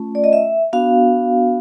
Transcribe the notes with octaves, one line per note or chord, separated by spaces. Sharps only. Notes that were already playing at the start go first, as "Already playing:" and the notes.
Already playing: A3 C#4 F4
D5
D#5
E5
B3 D4 F#4 F5